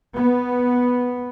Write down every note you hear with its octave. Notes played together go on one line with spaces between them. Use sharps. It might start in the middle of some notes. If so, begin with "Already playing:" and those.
B3